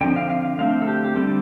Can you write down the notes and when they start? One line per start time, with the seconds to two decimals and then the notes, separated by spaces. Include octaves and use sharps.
0.01 D3 F3 C4 G5
0.16 F5
0.30 F5
0.45 F5
0.59 D3 A3 C4 F5
0.82 A4
0.88 G4
1.04 G4
1.16 D3 G3 C4 A4